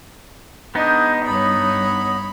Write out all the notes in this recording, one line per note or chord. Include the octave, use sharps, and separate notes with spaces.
G#3 B3 D4 D#4 D#5 D#6 G6
G2 C#5 B5 D#6